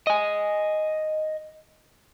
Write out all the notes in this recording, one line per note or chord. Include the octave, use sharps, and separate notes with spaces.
D#5 G#5